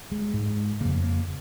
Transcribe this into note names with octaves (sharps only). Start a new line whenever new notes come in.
G#3
G#2
F2 C#3 A#3
A#3